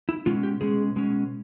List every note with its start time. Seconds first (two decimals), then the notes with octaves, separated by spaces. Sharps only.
0.09 E4
0.26 B2 G#3 C#4 F4
0.43 G4
0.61 B2 G#3 C#4 G#4
0.96 B2 G#3 C#4